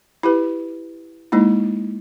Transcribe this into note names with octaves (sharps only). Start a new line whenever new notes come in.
E4 G4 B4
G#3 A#3 D#4 E4